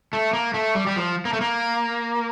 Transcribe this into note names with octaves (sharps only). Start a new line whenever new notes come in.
A3
A#3
A3
G3
G3
F3
A#3
A3
A#3